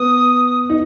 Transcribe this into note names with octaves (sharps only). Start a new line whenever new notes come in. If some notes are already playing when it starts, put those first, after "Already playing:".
Already playing: B3 D#6
D#4